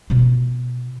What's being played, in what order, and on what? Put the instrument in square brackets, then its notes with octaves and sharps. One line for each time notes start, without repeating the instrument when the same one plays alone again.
[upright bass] B2 F4